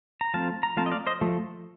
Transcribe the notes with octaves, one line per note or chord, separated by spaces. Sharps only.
A#5
F3 A3 C4 F5 A5
A#5
F3 A3 C4 F5 A5
D#5
D5 F5
C5 D#5
F3 A3